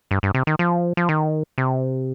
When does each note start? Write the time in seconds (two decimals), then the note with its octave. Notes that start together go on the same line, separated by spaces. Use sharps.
0.11 G2
0.23 G2
0.34 C3
0.47 D#3
0.59 F3
0.97 F3
1.09 D#3
1.58 C3